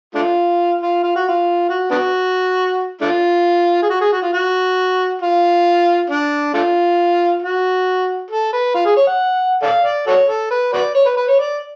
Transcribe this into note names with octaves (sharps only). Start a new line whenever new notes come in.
A3 D4 F4
F4
F4
F#4
F4
F#4
B3 D4 F#4
A3 D4 F4
G#4
F#4
G#4
F#4
F4
F#4
F4
D4
A3 D4 F4
F#4
A4
B4
F4
G#4
C#5
F#5
A4 D5 F5
D5
F#4 A4 C#5
A4
B4
F#4 B4 D5
C#5
B4
B4
C#5
D5